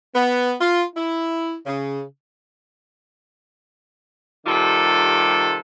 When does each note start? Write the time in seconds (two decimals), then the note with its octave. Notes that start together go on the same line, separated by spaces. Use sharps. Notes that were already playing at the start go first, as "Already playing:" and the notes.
0.15 B3
0.61 F4
0.96 E4
1.66 C#3
4.46 C3 D#3 G3 F4 A4